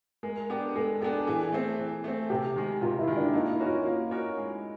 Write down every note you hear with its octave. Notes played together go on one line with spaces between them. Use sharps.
G#3 A#4
B3 D4 G4
G#3 A4
B3 D4 G4 G#4
E3 G#4
A3 C4
E3
A3 C4
C3 G4
D#3 G#3
C3 F4
E4
D#3 G#3
D4
A#3 D#4
E4
C#4 F#4 A#4 C#5
F4
A#3 F4
C#4 F#4 A#4 C#5
G#3